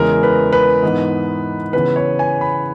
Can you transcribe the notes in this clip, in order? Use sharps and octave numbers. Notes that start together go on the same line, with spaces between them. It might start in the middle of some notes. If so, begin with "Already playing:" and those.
Already playing: E2 C#3 E3 G#3 A#4
B4
B4
G#2 E3 B3 D#4
C#3 E3 B3 B4
C#5
G#5
B5